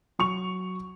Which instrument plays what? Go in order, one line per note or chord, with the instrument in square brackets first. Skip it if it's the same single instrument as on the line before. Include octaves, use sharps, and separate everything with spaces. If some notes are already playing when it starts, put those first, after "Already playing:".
[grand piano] F#3 C#6 F7